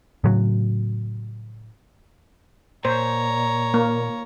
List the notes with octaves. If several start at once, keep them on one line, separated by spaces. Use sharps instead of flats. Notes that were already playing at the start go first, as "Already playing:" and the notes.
A2 C#3 F#3
A#2 C5 C#5 A#5
A#3